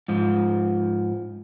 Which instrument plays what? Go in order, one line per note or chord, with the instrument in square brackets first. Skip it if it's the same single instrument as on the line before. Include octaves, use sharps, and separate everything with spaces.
[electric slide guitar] G#2 F3